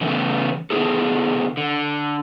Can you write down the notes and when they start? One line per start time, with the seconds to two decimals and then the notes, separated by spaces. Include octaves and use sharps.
0.01 C#3 E3 A3 B3
0.70 C3 B3 E4 G#4 A4
1.57 D3